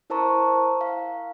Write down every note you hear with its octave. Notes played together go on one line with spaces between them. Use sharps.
E4 A#4 C5 A5 A#5 C#6
F5